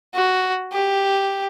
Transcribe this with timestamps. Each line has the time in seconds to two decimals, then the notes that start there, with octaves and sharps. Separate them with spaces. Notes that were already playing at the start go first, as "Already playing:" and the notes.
0.15 F#4
0.73 G4